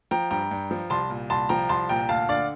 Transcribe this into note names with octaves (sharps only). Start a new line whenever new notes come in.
F3 G5 A#5
G2 G5 A#5
G2
F3
C2 A5 C6
A#2
C2 A5 C6
F3 G5 A#5
C2 A5 C6
A#2 G5 A#5
D2 F5 A5
D3 D5 F5